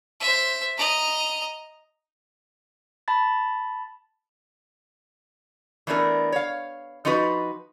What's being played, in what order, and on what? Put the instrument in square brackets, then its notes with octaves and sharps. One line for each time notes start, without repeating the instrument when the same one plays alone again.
[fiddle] C5 E5
D#5 A#5
[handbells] A5 B5 A6
[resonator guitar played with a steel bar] E3 A3 B3 D4 A#4
C#5 F5
F3 D#4 F4 F#4 B4